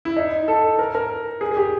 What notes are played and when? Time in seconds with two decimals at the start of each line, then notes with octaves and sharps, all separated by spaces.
0.05 E4
0.17 D#4
0.48 A4
0.79 A#4
0.95 A#4
1.41 G#4
1.51 G#4
1.56 G4